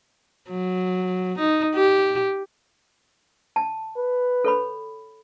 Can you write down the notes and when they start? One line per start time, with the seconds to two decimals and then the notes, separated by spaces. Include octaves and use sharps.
0.49 F#3
1.38 D#4
1.75 G4
3.56 A5
3.96 B4
4.44 A4 C#5 B5